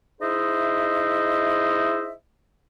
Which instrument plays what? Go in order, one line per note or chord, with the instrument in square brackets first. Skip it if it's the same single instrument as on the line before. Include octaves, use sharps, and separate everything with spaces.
[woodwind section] D#4 E4 G#4 C5 D#5 E5